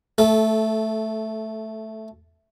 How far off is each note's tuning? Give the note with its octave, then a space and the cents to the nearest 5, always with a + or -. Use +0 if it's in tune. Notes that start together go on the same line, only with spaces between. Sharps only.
A3 +0 A4 -20